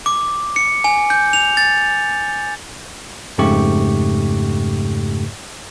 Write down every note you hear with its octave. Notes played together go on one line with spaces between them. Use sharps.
D6
C#7
G#5
G6
F7
A6
F2 G#2 C#3 A3 G4 C#6